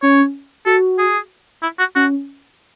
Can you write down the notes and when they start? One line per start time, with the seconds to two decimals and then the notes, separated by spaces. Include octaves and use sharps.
0.02 C#4 C#5
0.66 F#4 A4
0.98 G#4
1.63 E4
1.79 F#4
1.95 C#4 F#4